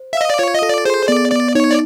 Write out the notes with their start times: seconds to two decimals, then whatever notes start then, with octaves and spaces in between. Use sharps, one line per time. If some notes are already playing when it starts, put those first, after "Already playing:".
Already playing: C5
0.13 E5 F5
0.21 D#5
0.30 D5
0.39 F4 C#5
0.55 D#5
0.62 A4
0.69 D5
0.85 G#4 C5
1.08 B3 D5
1.31 B3 D5
1.55 D#4 C#5
1.70 D5